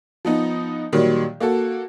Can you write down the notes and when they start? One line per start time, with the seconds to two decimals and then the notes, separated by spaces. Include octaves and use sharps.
0.25 F3 B3 D#4
0.92 A#2 D#3 F#3 G3
1.40 A#3 F#4 A4